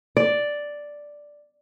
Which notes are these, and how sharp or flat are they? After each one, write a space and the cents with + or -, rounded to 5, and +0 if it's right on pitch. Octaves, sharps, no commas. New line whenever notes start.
D5 +0